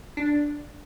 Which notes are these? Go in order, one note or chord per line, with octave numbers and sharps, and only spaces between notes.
D4